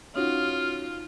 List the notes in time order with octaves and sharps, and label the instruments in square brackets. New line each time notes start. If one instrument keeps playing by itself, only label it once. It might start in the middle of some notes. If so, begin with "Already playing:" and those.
[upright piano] C#4 F#4 [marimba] D#4 [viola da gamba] F4 [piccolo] F6